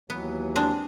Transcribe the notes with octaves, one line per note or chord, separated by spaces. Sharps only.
D#2 E3 F#3 B3
G#3 C4 D4